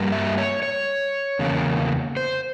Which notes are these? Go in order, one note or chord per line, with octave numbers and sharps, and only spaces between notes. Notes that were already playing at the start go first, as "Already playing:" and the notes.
Already playing: G2 G3 A#3
E5
C#5
C#5
E2 C#3 A#3
C5